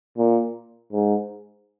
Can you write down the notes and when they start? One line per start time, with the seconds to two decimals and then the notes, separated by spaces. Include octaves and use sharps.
0.18 A#2
0.92 G#2